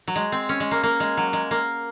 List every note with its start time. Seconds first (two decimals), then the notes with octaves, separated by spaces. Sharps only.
0.07 F#3
0.16 G#3
0.32 C4
0.49 C#4
0.60 G#3
0.71 A#3
0.83 A#3
1.00 G#3
1.17 F#3
1.33 G#3
1.51 A#3